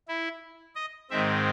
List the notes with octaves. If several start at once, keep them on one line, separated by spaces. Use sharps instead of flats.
E4
D#5
G#2 D#3 G#3 C4 E5